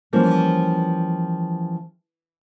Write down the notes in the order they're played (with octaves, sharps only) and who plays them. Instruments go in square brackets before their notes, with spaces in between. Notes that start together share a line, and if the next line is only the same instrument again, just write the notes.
[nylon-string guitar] E3 F3 G3 A#3 C#4